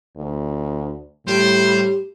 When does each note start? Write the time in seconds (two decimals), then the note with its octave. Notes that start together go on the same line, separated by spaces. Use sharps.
0.17 D2
1.27 A2 G3 G4 C5